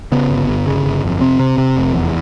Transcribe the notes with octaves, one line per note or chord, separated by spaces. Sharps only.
C#3 B3
G1
G1
C#3
G1
F2
C3 C4
C3
C3
F1
E2